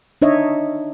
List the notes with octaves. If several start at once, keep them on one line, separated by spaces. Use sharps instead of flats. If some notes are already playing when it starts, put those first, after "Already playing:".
D4 D#4 C#5 D#5 E5